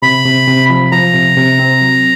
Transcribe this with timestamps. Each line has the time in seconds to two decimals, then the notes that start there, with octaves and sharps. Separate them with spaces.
0.02 C3 B5
0.25 C3
0.48 C3
0.70 F3
0.92 F3 A#5
1.14 C3
1.37 C3
1.59 C4
1.81 F#3